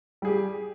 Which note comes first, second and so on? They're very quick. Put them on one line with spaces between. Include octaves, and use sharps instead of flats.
G3 G#4 G4